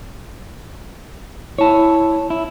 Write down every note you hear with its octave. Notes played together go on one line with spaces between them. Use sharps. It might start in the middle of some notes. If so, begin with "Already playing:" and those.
E4 C#5 A5
E4